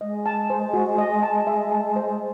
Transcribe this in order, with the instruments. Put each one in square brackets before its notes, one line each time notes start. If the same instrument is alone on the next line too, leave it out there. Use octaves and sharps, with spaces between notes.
[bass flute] G#3 [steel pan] D#5
[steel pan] A5
C5
F#4
D#5
A5
E5
A5
C5